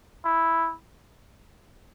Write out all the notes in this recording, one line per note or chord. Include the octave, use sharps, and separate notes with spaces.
E4